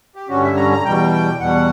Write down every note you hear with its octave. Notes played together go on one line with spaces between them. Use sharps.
G4
G2 D3 G3 C#4 F#4
E5
A#5
A#5
E2 B2 G3 G5
E2 B2 G3 F#5